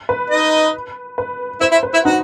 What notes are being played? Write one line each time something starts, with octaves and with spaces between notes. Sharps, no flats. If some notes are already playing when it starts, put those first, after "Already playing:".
B4
D#4 D#5
B4
E4 C5 E5
E4 E5
B4
E4 E5
D#4 F#4 F#5